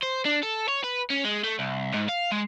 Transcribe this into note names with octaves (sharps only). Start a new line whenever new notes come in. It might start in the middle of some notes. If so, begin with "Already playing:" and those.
C5
D4
A4
C#5
B4
C#4
G#3
A3
C2
G#2
F5
G#3